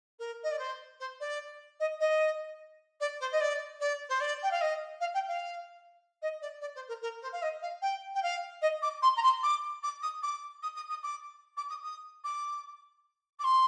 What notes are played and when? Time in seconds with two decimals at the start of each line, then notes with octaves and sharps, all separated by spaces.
0.19 A#4
0.43 D#5
0.51 D5
0.59 C5
1.00 C5
1.20 D5
1.80 D#5
2.00 D#5
3.00 D5
3.20 C5
3.32 D#5
3.40 D5
3.80 D5
4.09 C5
4.20 D5
4.43 G5
4.51 F5
4.61 D#5
5.00 F5
5.14 G5
5.28 F5
6.22 D#5
6.41 D5
6.61 D5
6.75 C5
6.88 A#4
7.02 A#4
7.22 C5
7.32 F5
7.42 D#5
7.62 F5
7.82 G5
8.15 G5
8.23 F5
8.61 D#5
8.82 D6
9.02 C6
9.16 A#5
9.22 C6
9.43 D6
9.83 D6
10.02 D#6
10.22 D6
10.62 D#6
10.76 D#6
10.89 D#6
11.03 D6
11.57 D6
11.70 D#6
11.83 D#6
12.24 D6
13.39 D6
13.44 C6